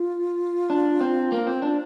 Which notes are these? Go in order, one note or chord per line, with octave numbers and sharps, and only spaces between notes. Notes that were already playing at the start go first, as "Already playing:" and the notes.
Already playing: F4
D4
C4
A#3
C4
D4